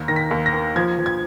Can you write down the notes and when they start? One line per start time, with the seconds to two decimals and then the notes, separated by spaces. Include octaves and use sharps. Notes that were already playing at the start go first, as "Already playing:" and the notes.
Already playing: D#2
0.08 D#3 A#6
0.16 B6
0.31 D#2
0.46 A#6
0.53 A#3
0.76 F3 G#6
0.98 F3
1.06 G#6